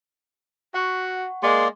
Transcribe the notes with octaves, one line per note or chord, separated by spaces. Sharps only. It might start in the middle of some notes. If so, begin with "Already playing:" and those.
F#4 F#5 C#6
G#3 A#3 D5 C6